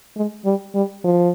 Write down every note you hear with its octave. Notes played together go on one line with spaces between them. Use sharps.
G#3
G3
G3
F3